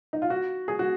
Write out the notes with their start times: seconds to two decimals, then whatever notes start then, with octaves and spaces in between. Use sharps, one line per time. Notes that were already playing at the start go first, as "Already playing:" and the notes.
0.13 D#4
0.22 F4
0.30 F#4
0.68 G#4
0.79 F#4